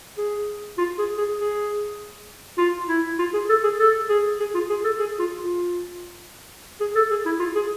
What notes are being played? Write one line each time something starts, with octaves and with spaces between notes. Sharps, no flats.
G#4
F4
G#4
G#4
G#4
F4
E4
F4
G#4
A4
G#4
A4
G#4
G#4
F4
G#4
A4
G#4
F4
F4
G#4
A4
G#4
E4
F4
G#4